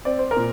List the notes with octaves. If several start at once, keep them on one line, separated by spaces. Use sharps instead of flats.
C4 D5
C5
A#4
A#2